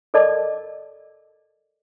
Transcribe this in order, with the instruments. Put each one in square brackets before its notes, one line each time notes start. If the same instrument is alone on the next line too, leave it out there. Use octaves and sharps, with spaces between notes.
[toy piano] A4 A#4 D5 D#5 A5 D6